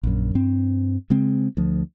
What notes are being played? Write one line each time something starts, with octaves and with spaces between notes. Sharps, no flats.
A#1 F#2
G2 C4
C#3 G#3 C4
D2 F3